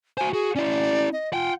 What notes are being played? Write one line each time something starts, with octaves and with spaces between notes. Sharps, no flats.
F#4 C5 G#5
F#4 G#4
C#4 E4 D5
D#5
F4 F#5 G5